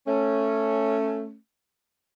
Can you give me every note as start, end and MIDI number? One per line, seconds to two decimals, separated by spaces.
0.07 1.36 57
0.07 1.36 61